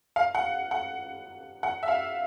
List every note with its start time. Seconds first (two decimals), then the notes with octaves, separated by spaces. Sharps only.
0.16 F5
0.35 F#5
0.71 F#5
1.63 F#5
1.83 E5
1.88 F5